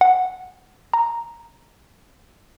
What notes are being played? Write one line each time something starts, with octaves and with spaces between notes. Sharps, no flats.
F#5
A#5